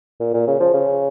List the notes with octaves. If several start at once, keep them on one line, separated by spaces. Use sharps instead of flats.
A#2
A#2
C#3
F3
C#3